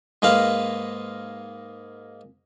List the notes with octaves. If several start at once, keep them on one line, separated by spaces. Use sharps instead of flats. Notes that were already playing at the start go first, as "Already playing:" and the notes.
G#2 G#3 A#3 B4 F5